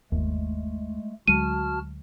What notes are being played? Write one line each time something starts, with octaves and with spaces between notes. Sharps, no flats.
G1 D#2 G#3 A3
D2 F#3 G#3 F#4 A5 F6 D#7